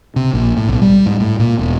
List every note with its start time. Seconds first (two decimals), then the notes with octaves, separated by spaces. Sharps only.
0.16 C3
0.34 A#1
0.57 A2
0.69 B1
0.82 G3
1.06 G#2
1.20 A2
1.39 A#2
1.59 E1